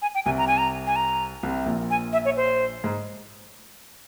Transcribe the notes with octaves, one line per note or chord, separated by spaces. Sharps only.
G#5
G5
C2 C3 G#5
A#5
G#5
A#5
G#5
A#5
C2 C3
A#1 A#2
G#5
E5
C#5
C5
G#2